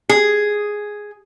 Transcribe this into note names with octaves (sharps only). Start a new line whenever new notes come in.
G#4